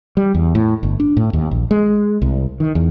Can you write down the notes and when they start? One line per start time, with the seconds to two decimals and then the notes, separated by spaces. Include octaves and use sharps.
0.17 G3
0.35 E2
0.55 A2
0.83 G1
1.00 D4
1.17 A2
1.33 D#2
1.51 A#1
1.71 G#3
2.22 C2
2.60 D#3
2.75 E2